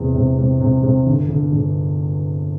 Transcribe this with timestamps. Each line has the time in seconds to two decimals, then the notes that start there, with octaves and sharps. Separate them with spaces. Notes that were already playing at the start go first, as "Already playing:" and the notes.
Already playing: E2 C3
0.15 C3
0.38 C3
0.60 C3
0.83 C3
1.07 G1
1.29 G1
1.52 G1